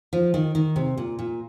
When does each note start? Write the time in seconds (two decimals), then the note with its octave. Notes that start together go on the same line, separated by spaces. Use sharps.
0.13 F3
0.34 D#3
0.55 D#3
0.76 C3
0.98 A#2
1.19 A#2